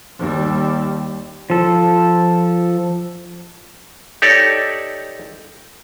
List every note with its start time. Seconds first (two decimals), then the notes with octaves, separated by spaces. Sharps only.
0.18 D#2 G3
1.50 F3 A4
4.22 D#4 G4 A4 C#5 D5